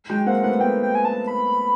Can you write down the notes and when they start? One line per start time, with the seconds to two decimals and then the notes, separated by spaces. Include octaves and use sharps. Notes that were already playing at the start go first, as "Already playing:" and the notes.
0.10 F#3 G#3 G5
0.26 A#3 C4 F#5
0.43 A3 B3 F#5
0.60 A3 B3 G5
0.83 G5
0.95 G#5
1.05 A5
1.27 B5